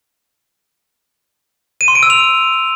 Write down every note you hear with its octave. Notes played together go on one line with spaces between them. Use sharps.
D#7
C6
D7
E6
F7